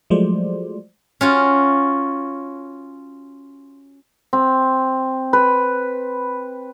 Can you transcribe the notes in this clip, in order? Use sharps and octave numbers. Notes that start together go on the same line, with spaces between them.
F3 F#3 G#3 A3 C5 D5
C#4 F4 F#4
C4
B4